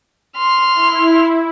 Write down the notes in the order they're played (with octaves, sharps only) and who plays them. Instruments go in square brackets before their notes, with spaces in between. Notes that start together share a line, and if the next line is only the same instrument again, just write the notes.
[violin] C6 F6
[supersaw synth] E4